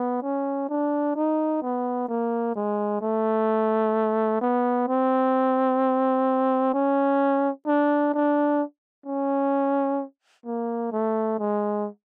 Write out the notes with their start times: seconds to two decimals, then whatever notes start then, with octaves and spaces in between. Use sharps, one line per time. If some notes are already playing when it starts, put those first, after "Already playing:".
Already playing: B3
0.23 C#4
0.69 D4
1.16 D#4
1.62 B3
2.09 A#3
2.56 G#3
3.02 A3
4.41 B3
4.88 C4
6.74 C#4
7.67 D4
8.14 D4
9.06 C#4
10.46 A#3
10.93 A3
11.39 G#3